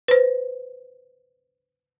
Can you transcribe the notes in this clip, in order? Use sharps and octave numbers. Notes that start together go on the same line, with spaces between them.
B4 C5